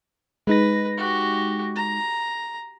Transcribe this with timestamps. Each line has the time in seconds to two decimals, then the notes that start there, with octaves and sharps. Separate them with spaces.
0.47 G#3 D#4 B4 A#6
0.97 F#4 G4
1.76 A#5